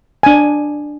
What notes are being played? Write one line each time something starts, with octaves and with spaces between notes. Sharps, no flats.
D4 G#5